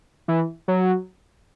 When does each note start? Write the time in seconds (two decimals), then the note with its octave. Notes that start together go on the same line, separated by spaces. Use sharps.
0.28 E3
0.68 F#3